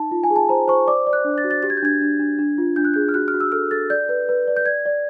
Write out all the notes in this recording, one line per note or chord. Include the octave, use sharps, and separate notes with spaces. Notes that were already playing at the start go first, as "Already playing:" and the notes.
Already playing: D#4 A5
F4
G#5
G#4
A5
C5 A#5
C5 C#6
D5 D6
D5
F#6
D4
A6
F#4
A6
G4 A6
G#6
G6
D4 G#6
D4
D4
D4
F4
D4 G6
F#6
G#4 G6
F6
F#4 F#6
F6
F#4
E6
A4 F6
A4 A6
D5 G6
B4
B4
D5
G6
D5 G#6
D5